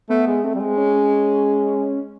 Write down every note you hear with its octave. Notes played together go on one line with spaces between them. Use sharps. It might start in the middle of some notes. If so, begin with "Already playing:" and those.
A3 B3
G#3
A3 C4
G3
G#3
C#4